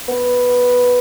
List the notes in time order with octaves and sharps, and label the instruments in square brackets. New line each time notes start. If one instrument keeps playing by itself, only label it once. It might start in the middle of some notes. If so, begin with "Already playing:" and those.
[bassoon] B3